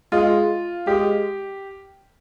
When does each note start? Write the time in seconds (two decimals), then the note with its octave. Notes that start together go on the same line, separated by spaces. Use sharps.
0.12 G#3 F4
0.87 G#3 G4